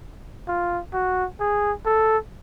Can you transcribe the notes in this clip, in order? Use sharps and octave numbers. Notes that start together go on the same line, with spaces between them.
F4
F#4
G#4
A4